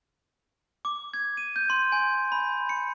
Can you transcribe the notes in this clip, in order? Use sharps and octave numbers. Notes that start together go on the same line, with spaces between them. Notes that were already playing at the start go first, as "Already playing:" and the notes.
D6
G#6
D#7
G6
C6
G#5
B5
C#7